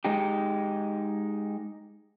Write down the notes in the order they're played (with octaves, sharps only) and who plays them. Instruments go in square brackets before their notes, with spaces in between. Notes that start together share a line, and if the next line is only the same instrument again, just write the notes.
[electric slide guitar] G#3 D#4 G4